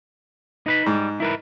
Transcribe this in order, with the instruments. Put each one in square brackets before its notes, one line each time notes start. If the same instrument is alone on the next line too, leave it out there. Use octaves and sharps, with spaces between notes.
[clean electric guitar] D#4 B4 B5
[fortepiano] G#2 [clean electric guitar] G3
[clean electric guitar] E4 A#4 B4